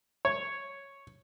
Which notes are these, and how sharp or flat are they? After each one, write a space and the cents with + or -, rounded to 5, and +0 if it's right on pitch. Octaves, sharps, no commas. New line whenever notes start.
C#5 -5